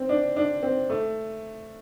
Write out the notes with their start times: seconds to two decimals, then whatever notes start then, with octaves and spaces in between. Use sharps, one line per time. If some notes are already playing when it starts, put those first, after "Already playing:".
Already playing: C4
0.09 D4
0.36 D4
0.62 C4
0.90 A3